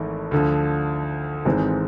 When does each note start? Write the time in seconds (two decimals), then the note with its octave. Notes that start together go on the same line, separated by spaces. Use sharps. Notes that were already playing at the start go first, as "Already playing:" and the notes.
Already playing: G#1 G#2 E3 A3 E4
0.31 D2 D3 F3
1.45 G#1 G#2 E3 G#3 C4